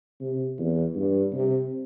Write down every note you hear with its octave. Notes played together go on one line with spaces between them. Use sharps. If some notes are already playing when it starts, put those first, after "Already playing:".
C3
E2
G2
C3